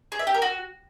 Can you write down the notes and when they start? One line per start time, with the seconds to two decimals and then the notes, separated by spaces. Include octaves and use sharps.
0.12 G#4
0.19 E5
0.27 G4
0.34 A#4
0.42 F#4